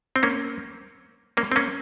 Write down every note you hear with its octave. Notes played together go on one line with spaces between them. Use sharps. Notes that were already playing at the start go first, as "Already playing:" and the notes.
C4
A#3 C#4
A#3 C#4
C4
A#3 C#4